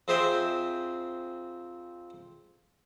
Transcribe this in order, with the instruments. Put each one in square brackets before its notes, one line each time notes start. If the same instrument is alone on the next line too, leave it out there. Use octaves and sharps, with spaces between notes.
[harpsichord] F2 C4 G#4 C5 E5 G5